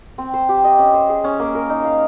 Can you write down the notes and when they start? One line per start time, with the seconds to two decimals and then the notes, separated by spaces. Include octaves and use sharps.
0.18 C4
0.34 C5
0.49 G4
0.64 D#5
0.79 C#4
0.94 C5
1.09 G#4
1.24 C#4
1.39 A#3
1.55 A#4
1.70 D#4
1.85 F5